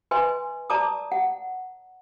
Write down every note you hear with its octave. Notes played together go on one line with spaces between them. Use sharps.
B4 D#5 G#5 C6
D5 A5 A#5 D6 D#6
F#5